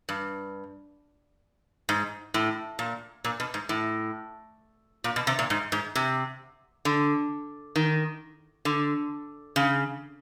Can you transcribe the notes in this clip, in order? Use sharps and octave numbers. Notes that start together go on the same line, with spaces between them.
G2
G#2
A2
A#2
A#2
B2
G#2
A2
A#2
B2
C3
A#2
G#2
G#2
C3
D3
D#3
D3
C#3